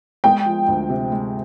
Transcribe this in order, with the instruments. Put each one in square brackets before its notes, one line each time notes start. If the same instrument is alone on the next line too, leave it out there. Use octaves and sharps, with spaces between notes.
[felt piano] G#3 [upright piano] G5
[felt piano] F3
D2
C3
G#3